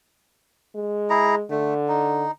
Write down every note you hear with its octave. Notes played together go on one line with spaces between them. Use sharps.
G#3
E4 G#4 A#5
D3 A3
D#4